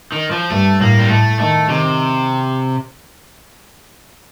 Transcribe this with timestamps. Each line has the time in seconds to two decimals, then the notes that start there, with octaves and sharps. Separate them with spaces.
0.12 D#3
0.31 F3
0.51 G2 A3
0.80 A2 A#3
0.99 G3
1.10 A2 A3
1.39 D#3 A3
1.69 C3 D#3